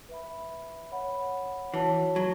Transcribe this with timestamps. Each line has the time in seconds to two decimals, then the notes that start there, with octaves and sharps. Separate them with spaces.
0.09 B4 E5 B5
0.92 C#5 F#5 B5
1.74 E3 F#4 C#5 A5
2.16 F#3